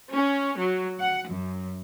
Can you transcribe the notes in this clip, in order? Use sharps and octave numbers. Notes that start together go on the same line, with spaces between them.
C#4
F#3
F#5
F#2